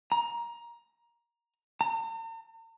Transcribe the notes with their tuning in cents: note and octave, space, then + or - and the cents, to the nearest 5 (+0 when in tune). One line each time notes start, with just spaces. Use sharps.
A#5 +15
A#5 -45